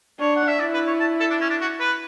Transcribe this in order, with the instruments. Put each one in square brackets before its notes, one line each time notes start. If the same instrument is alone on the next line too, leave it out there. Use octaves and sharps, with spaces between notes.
[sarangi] D4 [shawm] C#5
[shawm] F#5
E5
[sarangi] E4 [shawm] D5
[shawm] B4
C#5
A5
A4
D4
C#4
D4
F#4
B4